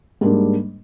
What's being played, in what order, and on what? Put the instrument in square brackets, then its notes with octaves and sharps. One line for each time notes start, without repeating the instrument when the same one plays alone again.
[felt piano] G#2 G3 A#3 D4